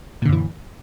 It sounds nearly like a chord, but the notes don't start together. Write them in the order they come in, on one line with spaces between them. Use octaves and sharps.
A#2 D3 F#2 E3